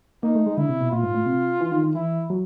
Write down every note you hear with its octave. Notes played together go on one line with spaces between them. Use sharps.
A#3 D#4
A3
G#3
D3 E4
C3
B2
A#2 F4
G#2
A2
C3
E3
D#3
D#3
E3 E4
F#3